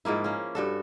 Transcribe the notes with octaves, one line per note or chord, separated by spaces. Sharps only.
G#2 F3 A#3 E4
A#3 C#4
G2 F#4 A4